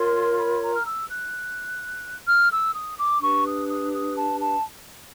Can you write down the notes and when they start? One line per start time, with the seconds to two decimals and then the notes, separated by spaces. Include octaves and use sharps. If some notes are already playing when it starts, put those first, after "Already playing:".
Already playing: F4 A#4 C#5 C6
0.38 B5
0.62 A#5
0.73 F6
0.86 E6
1.09 F#6
2.28 F6
2.51 E6
2.75 D#6
2.98 D6
3.22 D4 G4 B4 C#6
3.46 D#6
3.69 D#6
3.93 D#6
4.17 A5
4.40 A5